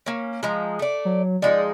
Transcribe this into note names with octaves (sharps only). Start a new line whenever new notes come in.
A#3 C#4
F3 G#3 A#5
A3 D5
F#3
F3 G#3 D#4 D5